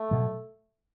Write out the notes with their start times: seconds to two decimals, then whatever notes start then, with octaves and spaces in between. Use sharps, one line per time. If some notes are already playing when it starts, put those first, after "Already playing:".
Already playing: A3
0.11 B2 F#3